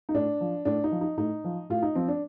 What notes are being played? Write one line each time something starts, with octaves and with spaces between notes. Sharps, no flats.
D#4
A2 D4
F3
A2 D4
D#4
F3
D#4
A2 D#4
F3
A2 F4
D#4
F3 C4
D4